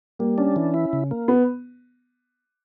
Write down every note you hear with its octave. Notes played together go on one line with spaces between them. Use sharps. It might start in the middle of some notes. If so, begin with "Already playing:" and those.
G3 A#3
C#4 D4
E3
E4
C#3
A#3
B3